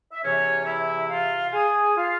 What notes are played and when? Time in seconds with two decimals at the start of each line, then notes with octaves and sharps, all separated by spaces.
0.11 E5
0.22 E2 C3 E3 C#4 C#5
0.65 E4 E5
1.08 F4 F5
1.52 G#4 G#5
1.95 F4 F5